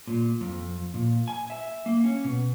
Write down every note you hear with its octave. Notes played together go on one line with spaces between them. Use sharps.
A#2
F2
A#2
G#5
E5
A#3
C#4
B2